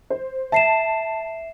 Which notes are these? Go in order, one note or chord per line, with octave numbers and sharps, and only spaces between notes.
C5
E5 A5 C7 E7